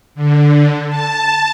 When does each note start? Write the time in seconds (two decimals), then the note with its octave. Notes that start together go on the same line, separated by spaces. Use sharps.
0.15 D3
0.88 A5